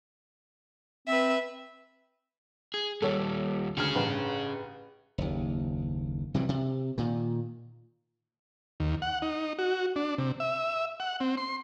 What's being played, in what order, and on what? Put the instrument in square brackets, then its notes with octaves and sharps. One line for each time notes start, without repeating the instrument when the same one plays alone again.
[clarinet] C4 [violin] B4 E5
[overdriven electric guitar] G#4
[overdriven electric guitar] D#2 G3 [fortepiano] A4 C#5
[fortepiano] D2 F6 [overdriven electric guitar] C#4 G#4
[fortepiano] A1 G2 B4
[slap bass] F#1 D#2
C3 E3 F#3 G3
C3
A#2 D#3
[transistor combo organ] D#2
F#5
D#4
F#4
D4
C3
E5
F#5
C4
C6